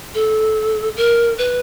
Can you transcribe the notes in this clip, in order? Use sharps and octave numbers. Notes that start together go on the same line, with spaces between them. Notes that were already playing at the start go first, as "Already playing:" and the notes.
A4
A#4
B4